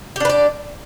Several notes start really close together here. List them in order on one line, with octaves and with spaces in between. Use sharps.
G4 D4 B4 D5